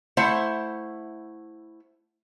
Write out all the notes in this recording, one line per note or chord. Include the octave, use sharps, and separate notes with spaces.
A3 E4 C5 F#5